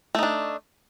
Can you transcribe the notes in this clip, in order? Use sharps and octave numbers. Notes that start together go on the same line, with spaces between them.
A3 D4 D#4